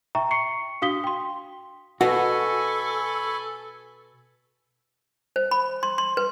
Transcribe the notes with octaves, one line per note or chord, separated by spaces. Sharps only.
E5 G5 A#5 C#6
C#6 C7 C#7
D4 F#4 F5 D#6 B6 G7
G5 C6
B2 F#4 A4 G#5 B5 C#6
C5
B5
C6
C6
B4